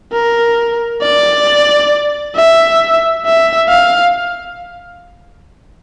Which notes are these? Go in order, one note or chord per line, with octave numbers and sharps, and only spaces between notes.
A#4
D5
E5
E5
F5